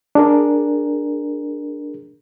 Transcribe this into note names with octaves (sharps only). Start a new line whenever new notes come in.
D4 G#4 A#4